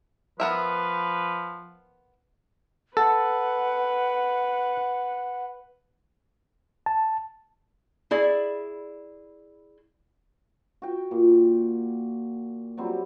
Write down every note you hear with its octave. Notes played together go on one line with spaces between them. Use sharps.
F3 B3 A#4 B4 E5
A4 B4 F#5
A5
E4 G#4 D5
F#4 G5
A#2
F#3 G3 C4